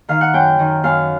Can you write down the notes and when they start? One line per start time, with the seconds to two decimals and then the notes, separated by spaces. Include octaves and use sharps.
0.09 D#3 F5
0.21 F#5
0.33 F#2 G5
0.59 D#3
0.84 F#2 F5